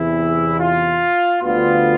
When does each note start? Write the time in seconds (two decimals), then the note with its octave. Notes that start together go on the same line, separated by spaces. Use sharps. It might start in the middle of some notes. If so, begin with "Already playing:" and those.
Already playing: E2 C3 E3 E4
0.59 F4
1.42 D2 D3 G3 B3 F4